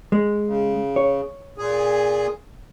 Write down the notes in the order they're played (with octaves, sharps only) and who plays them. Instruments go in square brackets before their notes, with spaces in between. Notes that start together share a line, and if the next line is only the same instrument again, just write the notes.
[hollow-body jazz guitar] G#3
[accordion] C#3
[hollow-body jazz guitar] C#5
[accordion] A#2 G#4